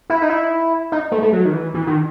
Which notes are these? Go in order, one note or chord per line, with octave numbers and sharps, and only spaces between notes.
E4
D#4
E4
D#4
A3
A3
F#3
D#3
E3
E3
D#3